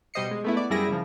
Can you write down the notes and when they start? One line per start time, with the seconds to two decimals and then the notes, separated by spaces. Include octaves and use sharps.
0.14 B2 G3 C5 D#5 C7 C#7
0.31 G#3
0.44 A3 B3 E4
0.57 D5
0.70 F#2 G3 E4 G#4 A#6 D7
0.89 C#3 F3